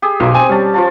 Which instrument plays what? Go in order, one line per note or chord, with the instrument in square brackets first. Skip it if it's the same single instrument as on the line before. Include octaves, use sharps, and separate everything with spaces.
[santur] G4 G#4
[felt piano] B1 B2 [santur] C5
[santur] C4 [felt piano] G#5
[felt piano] G3 [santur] C#4 A5
[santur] F3 F4 A5